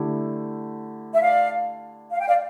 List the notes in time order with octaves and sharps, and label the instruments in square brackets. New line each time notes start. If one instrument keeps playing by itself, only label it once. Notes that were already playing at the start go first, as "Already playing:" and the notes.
Already playing: [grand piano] D3 A3 E4 G4
[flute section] E5
D5 F5
F5
G5
D5 F5